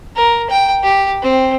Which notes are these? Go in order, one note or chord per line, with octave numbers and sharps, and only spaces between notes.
A#4
G5
G4
C4